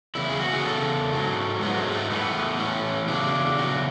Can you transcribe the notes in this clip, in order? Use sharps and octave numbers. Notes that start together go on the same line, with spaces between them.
E2 C#3 E4
G#4
F#4
G#4
E2 C#3 A4
G#2 F#3
G#2 F#3 B3
A3
G#3
A3
A2 E3 B3
A2 E3 C#4
E2 C#3 F#3 D4
E2 C#3 F#3 F#4